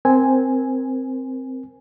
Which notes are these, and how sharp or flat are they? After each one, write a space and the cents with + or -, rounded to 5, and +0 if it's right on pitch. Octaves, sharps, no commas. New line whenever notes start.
C4 +0 A#4 +10 G#5 +0